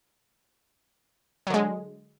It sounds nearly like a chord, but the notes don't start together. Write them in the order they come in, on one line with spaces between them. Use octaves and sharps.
F#3 D3 G#3